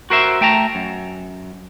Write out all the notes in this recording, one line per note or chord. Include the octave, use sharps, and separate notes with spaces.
F#4 A#4 C5 E5
A3 G5 A5 A#5
F#2